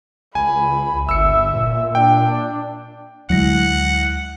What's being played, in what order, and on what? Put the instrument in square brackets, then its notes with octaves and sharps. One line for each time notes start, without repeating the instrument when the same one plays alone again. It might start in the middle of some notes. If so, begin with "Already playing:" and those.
[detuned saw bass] C#2 [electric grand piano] G#5 [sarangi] B5
[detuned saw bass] G1 [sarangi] E5 [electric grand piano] E6 C#7
[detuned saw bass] A#2
[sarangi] D4 [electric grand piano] G5
[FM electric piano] D2 E4 A#6 [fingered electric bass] F#3 G#3 [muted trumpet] F#5